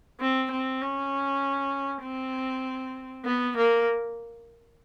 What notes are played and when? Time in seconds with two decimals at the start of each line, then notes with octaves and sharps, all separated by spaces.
0.20 C4
0.51 C4
0.81 C#4
2.03 C4
3.25 B3
3.57 A#3